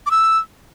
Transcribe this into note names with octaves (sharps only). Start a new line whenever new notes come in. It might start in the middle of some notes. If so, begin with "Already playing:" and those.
D6
E6